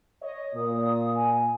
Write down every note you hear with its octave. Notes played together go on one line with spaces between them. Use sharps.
C#5 D#5
A#2 D#6
G#5